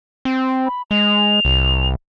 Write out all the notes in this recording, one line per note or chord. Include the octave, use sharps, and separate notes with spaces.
C4
B5
G#3 F7
C2